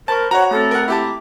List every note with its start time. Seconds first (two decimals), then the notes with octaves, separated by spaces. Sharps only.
0.08 A#4 C5 A5 B5 C#6
0.31 F#4 C#5 F#5 A#5
0.51 A3 C4 A4
0.71 A#4 F#5
0.88 E4 G4 A5 D6